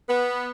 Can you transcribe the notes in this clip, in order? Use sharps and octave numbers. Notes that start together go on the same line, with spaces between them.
B3